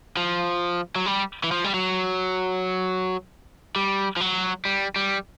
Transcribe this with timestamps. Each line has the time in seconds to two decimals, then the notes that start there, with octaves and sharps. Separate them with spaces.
0.17 F3
0.96 F#3
1.06 G3
1.44 E3
1.51 F3
1.64 G3
1.74 F#3
3.76 G3
4.17 F3
4.20 F#3
4.65 G3
4.96 G3